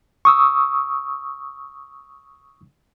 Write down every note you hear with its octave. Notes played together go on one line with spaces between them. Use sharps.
C#6 D#6 E6